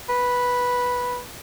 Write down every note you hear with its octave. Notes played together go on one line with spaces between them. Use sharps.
B4